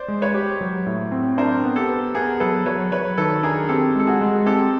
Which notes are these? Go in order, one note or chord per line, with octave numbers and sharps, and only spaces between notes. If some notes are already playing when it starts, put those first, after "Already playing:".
Already playing: C5 D5
G#3
B4 C#5
G4
F#3
A2
C4
D4 A#4 C5
B3
G4 A4
B4
B3 G#4 A#4
F#3 A4 B4
F#3 B4 C#5
F#3 B4 C#5
D#3 A4 B4
D4 G#4 A#4
C4 G4 A4
G#3 A4
F#4 G#4
G#3
C4 G4 A4